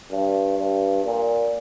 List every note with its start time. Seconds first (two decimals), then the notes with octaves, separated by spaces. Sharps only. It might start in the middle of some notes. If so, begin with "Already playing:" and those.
0.11 G2
0.58 G2
1.04 A#2